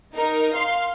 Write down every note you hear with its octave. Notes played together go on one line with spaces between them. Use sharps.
D#4 A#4
F5 C6